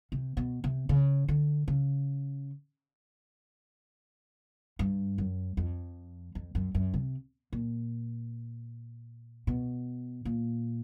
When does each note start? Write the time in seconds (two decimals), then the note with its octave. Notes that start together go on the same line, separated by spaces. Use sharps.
0.12 C3
0.37 B2
0.64 C3
0.89 C#3
1.28 D3
1.68 C#3
4.79 G2
5.18 F#2
5.57 F2
6.35 F2
6.55 F#2
6.75 F#2
6.94 C3
7.53 A#2
9.47 B2
10.25 A#2